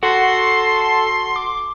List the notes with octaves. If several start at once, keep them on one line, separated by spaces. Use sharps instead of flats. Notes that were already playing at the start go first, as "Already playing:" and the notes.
F#4 A4 C6
D6